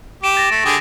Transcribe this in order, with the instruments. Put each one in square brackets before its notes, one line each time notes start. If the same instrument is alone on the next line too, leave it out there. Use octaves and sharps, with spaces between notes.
[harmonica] G4 [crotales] D7 E7
[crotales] A6 A#6
[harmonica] A3
D3 G4 G#4